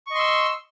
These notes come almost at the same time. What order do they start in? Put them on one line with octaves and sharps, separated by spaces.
C#6 D#5 C6 E6